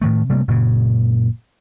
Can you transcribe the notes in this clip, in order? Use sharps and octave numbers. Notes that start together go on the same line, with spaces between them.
A2 D#3 A3
C3 G3 A3 A#3
F#1 A#2 C#3